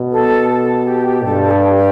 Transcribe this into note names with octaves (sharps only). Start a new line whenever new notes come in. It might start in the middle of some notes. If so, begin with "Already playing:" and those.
Already playing: B2
A4
A4
G4
G2 A4
A4
G4
G4